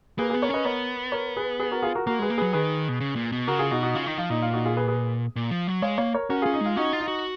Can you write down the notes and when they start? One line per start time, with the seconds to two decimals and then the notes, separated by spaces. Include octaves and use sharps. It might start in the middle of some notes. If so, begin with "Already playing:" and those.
0.18 A#3 G#4 B4
0.30 B3 G#4 B4
0.42 A#4 C#5
0.49 C#4 B4 D#5
0.65 B3 A#4 C#5
1.12 A#4 C#5
1.37 G#4 B4
1.60 G#4 B4
1.71 F#4 A#4
1.82 F4 G#4
1.95 F#4 A#4
2.07 A#3 F#4 A#4
2.19 G#3 G#4 B4
2.30 A#3
2.38 F#3 G#4 B4
2.53 D#3 G#4 B4
2.88 B2
3.00 C#3
3.16 A#2
3.32 B2
3.47 C#3 F#4 A#4
3.59 F4 G#4
3.71 B2 D#4 F#4
3.83 D#4 F#4
3.95 C#3 F4
4.06 D#3 D#4
4.18 F3 F4
4.30 A#2 D#4
4.42 F4
4.53 D#4 F#4
4.65 F4 G#4
4.77 G#4 B4
4.88 G#4 B4
5.36 A#2
5.51 F3
5.68 F#3
5.82 G#3 C#5 F5
5.98 A#3 C#5 F5
6.14 A#4 C#5
6.30 C#4 F#4 A#4
6.42 C#4 F4 G#4
6.53 D#4
6.61 G#3 F4
6.76 C#4 D#4 F#4
6.93 F4
7.00 D#4
7.08 F#4